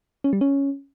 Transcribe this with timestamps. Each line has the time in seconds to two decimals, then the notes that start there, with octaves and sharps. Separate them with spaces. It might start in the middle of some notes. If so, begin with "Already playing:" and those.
0.24 C#4
0.33 G3
0.41 C#4